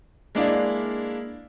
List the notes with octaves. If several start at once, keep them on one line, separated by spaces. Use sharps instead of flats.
G#3 A#3 D4 E4 D5 F5